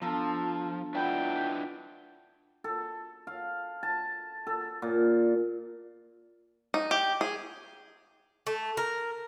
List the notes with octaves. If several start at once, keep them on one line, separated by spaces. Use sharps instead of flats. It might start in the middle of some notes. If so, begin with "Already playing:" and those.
F3 B3 D4 A4 A#5
D4 E4 F4 B4 F#5 G5
A4
F5
A5
A4
A#2
D#4
G4
G#4
A3
A#4